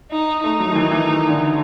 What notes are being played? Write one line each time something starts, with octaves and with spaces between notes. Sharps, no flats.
D#4
A3 D#4
F#3
D#3
E3
E3
D#3
D3